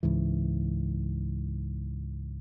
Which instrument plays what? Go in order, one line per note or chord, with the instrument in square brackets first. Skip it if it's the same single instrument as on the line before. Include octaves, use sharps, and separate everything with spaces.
[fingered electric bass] C#2 G#2 E3